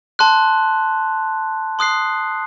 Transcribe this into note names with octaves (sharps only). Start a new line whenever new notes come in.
A5 C6 F#6
C6 D#6 F#6 C7